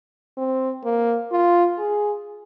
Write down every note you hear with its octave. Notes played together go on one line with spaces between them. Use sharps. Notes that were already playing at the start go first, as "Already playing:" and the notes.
C4
A#3
F4
G#4